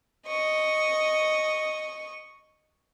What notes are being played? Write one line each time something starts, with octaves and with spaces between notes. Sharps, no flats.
D#5 C#6